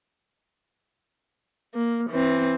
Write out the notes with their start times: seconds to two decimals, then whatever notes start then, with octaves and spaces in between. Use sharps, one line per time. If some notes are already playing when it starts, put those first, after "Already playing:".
1.74 A#3
2.10 E3 C4